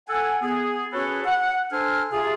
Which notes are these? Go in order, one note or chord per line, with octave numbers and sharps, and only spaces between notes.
A4 F#5 G#5
B3 G#4
C#4 F#4 G#4 A4 B4 C#5
F#5
D4 A4 C5 G#5 F6
C3 F4 G#4